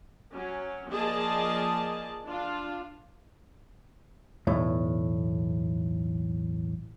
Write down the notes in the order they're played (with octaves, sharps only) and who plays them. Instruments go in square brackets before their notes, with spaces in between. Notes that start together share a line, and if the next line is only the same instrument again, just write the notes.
[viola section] F#3 C#4
F3 A#3 G#4 D5 D#5 A5
D4 F4
[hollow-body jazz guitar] B1 E2 A2